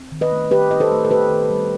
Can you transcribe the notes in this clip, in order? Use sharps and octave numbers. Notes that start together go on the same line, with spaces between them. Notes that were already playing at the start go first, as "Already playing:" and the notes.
Already playing: C4
D#3
B4 D#5
A3
D#3 G4 B4
C4 D#5
A4 C5
A3
A4
B3 G4 B4
D#3
G3